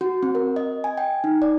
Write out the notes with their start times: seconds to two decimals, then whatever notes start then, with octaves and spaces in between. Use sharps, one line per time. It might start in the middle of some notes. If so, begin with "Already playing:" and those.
0.01 F#4
0.23 C4
0.35 A#4
0.56 D#5
0.84 G#5
0.98 G5
1.24 D#4
1.42 D5